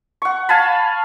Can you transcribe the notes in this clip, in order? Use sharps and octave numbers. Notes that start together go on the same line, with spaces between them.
F#5 C#6
F5 G#5 A5 B5